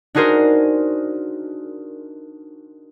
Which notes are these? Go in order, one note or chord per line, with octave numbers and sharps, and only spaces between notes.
D4 D#4 F#4 G#4 A#4 C5